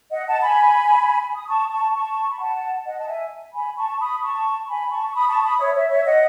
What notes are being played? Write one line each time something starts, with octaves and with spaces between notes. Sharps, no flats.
D#5 F#5
F#5 A5
G#5 B5
D#6
A5 C#6
A5 C#6
A5 C#6
B5
F#5 A5
D#5 F#5
A5
E5 G#5
G#5 B5
A5 C#6
B5 D#6
A5 C#6
G#5 B5
A5 C#6
C#6
B5 D#6
A5 C#6
B5 D#6
C#5 E5
C#5 E5
C#5 E5
D#5 F#5